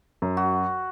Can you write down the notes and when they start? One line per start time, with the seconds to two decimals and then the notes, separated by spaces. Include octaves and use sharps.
0.22 F#2
0.37 F#4